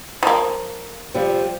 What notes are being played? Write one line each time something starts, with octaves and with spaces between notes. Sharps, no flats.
F3 A#3
C3 F3 G3